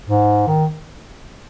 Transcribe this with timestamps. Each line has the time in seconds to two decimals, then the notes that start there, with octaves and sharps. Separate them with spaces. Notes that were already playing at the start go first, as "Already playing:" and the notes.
0.09 G#2
0.47 D#3